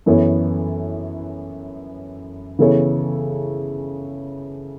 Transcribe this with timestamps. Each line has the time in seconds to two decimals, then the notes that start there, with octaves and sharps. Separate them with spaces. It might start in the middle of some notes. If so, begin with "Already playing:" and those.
0.06 F#2 E3 B3 A4 C#5
2.59 C#3 E3 B3 A4 C#5